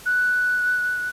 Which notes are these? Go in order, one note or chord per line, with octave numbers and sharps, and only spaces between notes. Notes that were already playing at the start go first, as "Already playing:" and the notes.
F#6